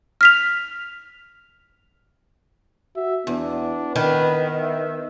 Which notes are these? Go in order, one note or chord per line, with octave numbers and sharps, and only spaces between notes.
F6 B6 F7
F#4 E5
E2 B3 D4
D#3 B4
E5